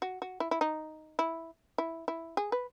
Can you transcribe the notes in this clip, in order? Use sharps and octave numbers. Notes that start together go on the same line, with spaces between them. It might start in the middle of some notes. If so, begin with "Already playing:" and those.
F#4
F#4
E4
E4
D#4
E4
E4
E4
G#4
B4